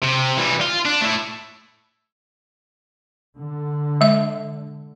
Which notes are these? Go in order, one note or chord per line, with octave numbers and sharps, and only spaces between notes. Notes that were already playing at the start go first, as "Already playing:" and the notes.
C3
E3 G3
F4
D4
A3 E4
D3
G#3 E5